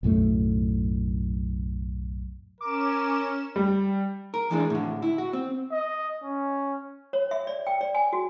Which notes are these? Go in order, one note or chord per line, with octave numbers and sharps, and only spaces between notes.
B1 F#2 A2 A3
C#4 A#4 D6 E7
G3
A#4
E3 G#3 D4
A2 D3
E4
F#4
C4
D#5
C#4
C#5
E5
D5
G5
D5
G#5
F#4